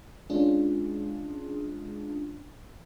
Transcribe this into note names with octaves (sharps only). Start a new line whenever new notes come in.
G#3 C#4 D4 F4 G#4